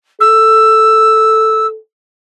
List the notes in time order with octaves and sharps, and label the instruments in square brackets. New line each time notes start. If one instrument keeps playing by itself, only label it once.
[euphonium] A4 [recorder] E6